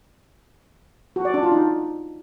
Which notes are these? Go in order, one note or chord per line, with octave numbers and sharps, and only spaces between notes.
F#4
D5
D4
F4
D#4